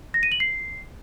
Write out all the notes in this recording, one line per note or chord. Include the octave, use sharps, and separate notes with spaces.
A#6
D#7
F#7
C7